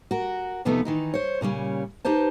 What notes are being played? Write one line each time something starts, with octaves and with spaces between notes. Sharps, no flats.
F#4 A#4
E2 C3 F3 A3 B3 D#4
D#3 E3 D#4
C5 C#5
A#2 C#3 G3 C#4
D#4 G4 B4 C5 A5